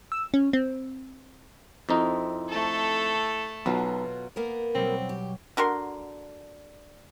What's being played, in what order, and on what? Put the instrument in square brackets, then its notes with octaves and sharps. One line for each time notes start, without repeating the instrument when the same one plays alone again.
[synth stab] E6
C#4
C4
[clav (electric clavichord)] F2 D#4 [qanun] C4 E4 A#4
[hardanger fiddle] A3 A4
[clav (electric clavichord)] B1 [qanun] B2 F#3 F4
[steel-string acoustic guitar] A#3 B3 A#4
[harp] B2 F#3 G3 [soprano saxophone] C4
[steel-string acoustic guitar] G4
[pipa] D3 F#4 A#4 C6